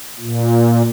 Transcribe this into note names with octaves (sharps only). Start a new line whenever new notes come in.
A#2